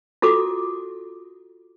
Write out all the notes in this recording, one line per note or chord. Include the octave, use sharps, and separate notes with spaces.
F4 F#4 A4 D6